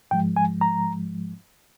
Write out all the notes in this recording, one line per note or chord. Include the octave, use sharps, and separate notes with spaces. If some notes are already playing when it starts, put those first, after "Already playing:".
G#2 F3 G#3 G5
G#5
A#5